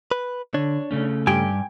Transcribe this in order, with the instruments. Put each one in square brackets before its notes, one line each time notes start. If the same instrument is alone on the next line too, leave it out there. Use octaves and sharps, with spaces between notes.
[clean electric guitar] B4
[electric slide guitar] D3 [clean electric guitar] D4 C#5
[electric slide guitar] C#3 A3 C#4
[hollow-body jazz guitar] G2 G4 [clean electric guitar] G5 G#5